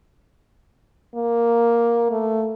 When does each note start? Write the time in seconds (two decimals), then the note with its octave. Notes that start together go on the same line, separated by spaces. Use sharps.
1.15 A#3
2.11 A3